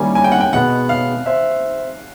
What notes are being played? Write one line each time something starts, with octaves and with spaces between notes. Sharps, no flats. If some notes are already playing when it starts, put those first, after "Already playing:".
Already playing: D#3 G3 A#3 C#4 E4 G#5
G#5
G5
F#5
G5
B2 G#3 B3 F#5
F5
C5 E5